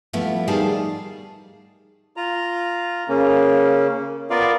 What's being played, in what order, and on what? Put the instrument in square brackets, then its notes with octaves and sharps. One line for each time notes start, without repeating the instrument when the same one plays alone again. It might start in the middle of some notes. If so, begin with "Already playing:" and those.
[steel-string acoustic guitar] F3 G3 A3 B3 E4
D#3 G3 G#4 D5 F5 A5
[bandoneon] F4 A#5
C#3 A#3 C#4
B3 F4 A#4 D5 F5